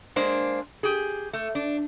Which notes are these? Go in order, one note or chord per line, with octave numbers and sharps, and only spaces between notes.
G#3 A#3 D4 C5
G4 G#4
A3
D4